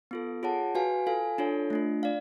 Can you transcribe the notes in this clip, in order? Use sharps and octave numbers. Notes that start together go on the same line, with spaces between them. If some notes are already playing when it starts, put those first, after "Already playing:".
B3 F4 A4
F4 G#4 C#5 F#5 A5
F#4 B4 F5 G#5
F4 A4 F5 G#5
D4 F4 A4 C#5
A3 D4 F4
D5 F5